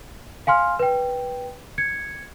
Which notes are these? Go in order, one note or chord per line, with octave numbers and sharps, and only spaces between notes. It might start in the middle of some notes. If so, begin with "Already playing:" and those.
F5 G#5 C6 F6
B4 G5
G#6 C#7